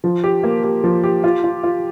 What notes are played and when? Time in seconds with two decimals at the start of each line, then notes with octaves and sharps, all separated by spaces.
0.04 F3
0.24 G4
0.43 A#3
0.64 G4
0.84 F3
1.04 G4
1.24 F4
1.44 F4
1.63 F4